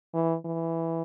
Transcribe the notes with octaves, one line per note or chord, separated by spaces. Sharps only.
E3
E3